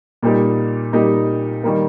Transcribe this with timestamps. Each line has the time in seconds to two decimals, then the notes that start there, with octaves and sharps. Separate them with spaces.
0.22 A#2 G3 A#3 D#4 G4
0.93 A#2 G3 A#3 D#4 G4
1.63 D#3 G3 A#3